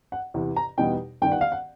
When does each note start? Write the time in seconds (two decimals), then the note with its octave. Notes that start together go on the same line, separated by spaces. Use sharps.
0.12 F#5
0.34 E2 C3 E3
0.56 A#5
0.78 E2 B2 G3 B3 D#4 G5
1.22 G1 G2 D#3 G5
1.32 F#5
1.41 F5
1.52 F#5